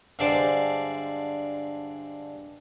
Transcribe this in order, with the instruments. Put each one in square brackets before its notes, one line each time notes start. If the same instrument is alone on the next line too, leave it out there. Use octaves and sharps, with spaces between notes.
[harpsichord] G2 D3 G#3 C5 D5 D6